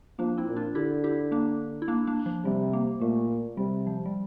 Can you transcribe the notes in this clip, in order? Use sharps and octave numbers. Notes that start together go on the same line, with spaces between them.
F3 A#3 D4
C4 E4
A#2
D4 F4
D3 E4 G4
E4 G4
A#3 D4
E4
A#3 D4
A#3 D4
F3
C3 G3
A#3
A#2 A3
C3 G3
F3
G3